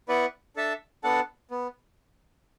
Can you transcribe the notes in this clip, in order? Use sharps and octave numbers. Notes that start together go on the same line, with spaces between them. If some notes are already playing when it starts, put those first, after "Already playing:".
B3 E4 B4 D5 F#5
D4 A4 E5 A5
B3 D4 A4 F#5 A5
B3